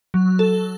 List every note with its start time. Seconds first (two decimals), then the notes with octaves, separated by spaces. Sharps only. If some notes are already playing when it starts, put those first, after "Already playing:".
0.14 F#3
0.39 A4